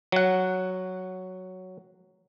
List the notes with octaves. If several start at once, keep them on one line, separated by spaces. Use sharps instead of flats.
F#3 F#5